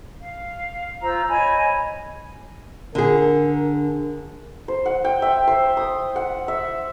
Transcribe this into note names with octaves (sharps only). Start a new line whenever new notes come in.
F5
F4 C5 A#5 E6
C#5 D#5 G#5 B5
D3 G#4 A#4
C5
F#5
G5
E5
C5
D#6
F#5
E5